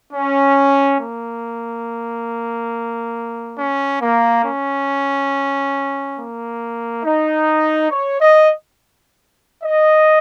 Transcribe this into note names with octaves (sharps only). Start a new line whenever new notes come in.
C#4
A#3
C#4
A#3
C#4
A#3
D#4
C#5
D#5
D#5